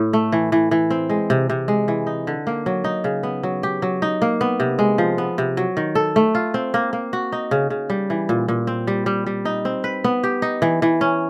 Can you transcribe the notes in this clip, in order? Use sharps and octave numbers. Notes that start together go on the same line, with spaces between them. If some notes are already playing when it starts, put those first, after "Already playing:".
Already playing: A2
A3
E3
E3
E3
C4
G#3
C3
C3
G#3
E3
D#4
D3
A#3
F#3
D#4
C#3
B3
F#3
G4
F#3
D#4
A#3
B3
C3
G#3
F3
B3
C3
F#3
D#3
A4
A3
F4
C4
A#3
A#3
F#4
D#4
C#3
C#3
G3
E3
A#2
A#2
C4
G3
G3
G3
D#4
C4
B4
B3
G4
D#4
E3
E3
C#4